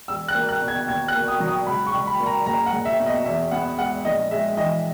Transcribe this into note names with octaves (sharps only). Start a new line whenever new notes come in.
E1 E6
F#6
A#3
F#6
B2
G#6
D#2 G#6
F#6
A#3
D#6
F#3
D#6
C#2 B5
C#6
C#2
B5
A#3
A#5
F#1 A#5
F#5
F#1
E5
B2
D#5
E2 E5
B3 F#5
G#3 F#5
A#1 D#5
G#3 E5
E3 D#5